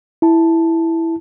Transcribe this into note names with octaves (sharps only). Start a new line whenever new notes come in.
E4 A5